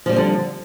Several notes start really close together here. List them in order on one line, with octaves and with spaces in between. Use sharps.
F3 G3 C4 D3